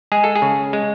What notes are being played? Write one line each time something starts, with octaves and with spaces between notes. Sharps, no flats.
G#3 G#4
A4
G#4
C#3
G#3